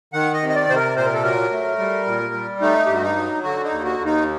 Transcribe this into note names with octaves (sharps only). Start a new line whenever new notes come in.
D#3 F#5
D#5
C3
D#5
D5
C3 C5
A#4
A#2 C5
A#4
A4
F#3 A#4
A3
G3
A#2
G3
A3 D#4
G2 G4
F#4
D#4
F#3
D3 F#4
D#4
D#2
F#4
D#2
D#4